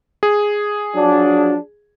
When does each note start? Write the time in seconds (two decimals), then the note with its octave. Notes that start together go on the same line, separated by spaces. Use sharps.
0.23 G#4
0.96 F3 F#3 D4